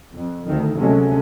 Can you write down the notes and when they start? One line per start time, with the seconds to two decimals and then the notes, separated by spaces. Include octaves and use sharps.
0.13 F2
0.45 D2 D#3
0.78 D2 C3 F#3 G#3 A3 C#4